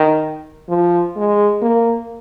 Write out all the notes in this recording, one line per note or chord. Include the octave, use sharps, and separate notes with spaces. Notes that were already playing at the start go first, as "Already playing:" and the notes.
Already playing: D#3
F3
G#3
A#3